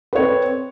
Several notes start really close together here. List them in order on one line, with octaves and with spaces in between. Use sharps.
B4 C#5 C4